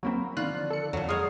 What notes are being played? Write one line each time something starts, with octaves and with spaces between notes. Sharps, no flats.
F#3 A#3 C4 A#5 B5 C#6
D3 D#3 F3 F4 D5 F#6
A4 C#7
F2 A#2 F#3
G#3 C#5 A#5 D#6 F6 C7